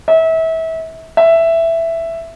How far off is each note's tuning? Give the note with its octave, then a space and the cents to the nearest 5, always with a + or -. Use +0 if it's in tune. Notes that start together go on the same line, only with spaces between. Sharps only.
E5 -30
E5 +5